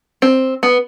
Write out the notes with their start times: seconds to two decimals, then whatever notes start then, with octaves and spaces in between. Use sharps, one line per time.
0.22 C4
0.63 B3